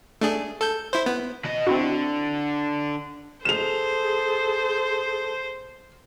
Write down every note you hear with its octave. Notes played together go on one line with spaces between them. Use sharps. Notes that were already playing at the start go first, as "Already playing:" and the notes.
A3 D4 G#4
A4 G6
E4 C5
B3
B2 D#5
D3 C4 E4 F#4
G#4 A4 C5 E7 F7